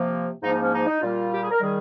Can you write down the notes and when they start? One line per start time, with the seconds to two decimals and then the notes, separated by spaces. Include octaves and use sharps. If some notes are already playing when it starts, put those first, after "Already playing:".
Already playing: C3 F3 A#3
0.42 G#2 F3 A#3 D#4
0.52 D#4
0.62 C#4
0.72 D#4
0.87 D#4
1.01 A#2 G3 A#3 F4
1.31 G4
1.41 G#4
1.50 A#4
1.61 D#3 G3 G#4